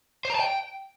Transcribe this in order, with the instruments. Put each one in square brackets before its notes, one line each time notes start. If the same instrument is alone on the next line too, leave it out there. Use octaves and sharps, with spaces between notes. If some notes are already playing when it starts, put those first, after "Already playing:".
[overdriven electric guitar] C5
A#5
A5
G5